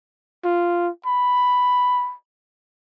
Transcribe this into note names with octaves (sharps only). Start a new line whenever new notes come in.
F4
B5